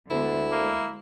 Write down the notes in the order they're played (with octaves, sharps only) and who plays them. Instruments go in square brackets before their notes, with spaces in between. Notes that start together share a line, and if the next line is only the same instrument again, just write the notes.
[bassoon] D2 [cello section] D3 G#3 B3 [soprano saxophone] E4
[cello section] G#3 [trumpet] A#3